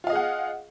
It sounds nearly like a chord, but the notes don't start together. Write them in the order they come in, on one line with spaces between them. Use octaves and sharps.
F4 F5 D#5 G#4 F#5